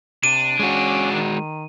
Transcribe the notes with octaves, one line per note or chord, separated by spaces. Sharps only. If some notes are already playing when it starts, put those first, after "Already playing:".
C3 D4 D#7
G#3 C#4 F#4
D#3